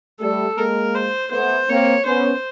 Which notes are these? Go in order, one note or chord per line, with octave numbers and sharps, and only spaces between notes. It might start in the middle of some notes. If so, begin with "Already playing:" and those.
G3 A3 A4
G#3 A#3 A#4
C5
A3 B3 C5
A#3 C4 C#5
B3 C#4 C5